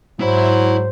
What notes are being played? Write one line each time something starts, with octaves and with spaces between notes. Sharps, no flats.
G#2 F#3 E4 C5 B5